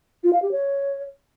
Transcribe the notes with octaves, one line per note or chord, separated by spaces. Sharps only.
F4
F5
G4
C#5